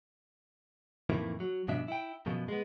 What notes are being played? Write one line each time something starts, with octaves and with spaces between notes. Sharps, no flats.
F2 A2 D#3 E3 A#3 E4
F#3
G2 B2 F3 D4 E5
E4 G5
F#2 B2 F3 F#3
G#3 B3